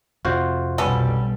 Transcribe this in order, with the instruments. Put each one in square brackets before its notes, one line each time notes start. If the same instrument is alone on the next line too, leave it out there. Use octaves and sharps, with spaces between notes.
[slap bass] F2 C3 [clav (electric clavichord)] F4 F#4 C5
[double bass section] B1 B2 G3 [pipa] B3 C#4 A4